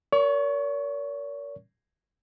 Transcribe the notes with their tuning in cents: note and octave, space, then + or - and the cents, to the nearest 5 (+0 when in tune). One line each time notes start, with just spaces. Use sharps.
A#4 +0 C#5 +45 C#6 +0